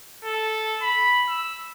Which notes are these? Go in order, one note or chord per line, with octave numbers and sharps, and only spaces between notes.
A4
B5
E6